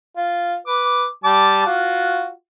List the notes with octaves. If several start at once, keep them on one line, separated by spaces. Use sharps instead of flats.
F4
B4 D6
G3 A5 D6
F4 F#4